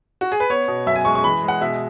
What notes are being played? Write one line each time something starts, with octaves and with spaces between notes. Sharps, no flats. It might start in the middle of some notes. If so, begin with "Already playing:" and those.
F#4
G#4
B4
B3 C#5
B2
F#2 E5
G#5
G#3 C#6
C#6
E3 B5
G#3
F#5
B2 E5